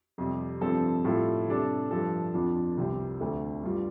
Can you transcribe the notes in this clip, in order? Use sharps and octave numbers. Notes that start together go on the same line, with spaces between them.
F2 C3 G3
G2 F3 C4 A4
A2 G3 F4 A4
C3 G3 D4 A4
G2 F3 D4 A4
F2 F3 D4 F4
C2 C3 G3 C4
D2 D3 A3
G2 G3 F4